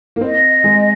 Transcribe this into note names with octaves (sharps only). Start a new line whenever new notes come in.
A#3
C4 D#5
G#3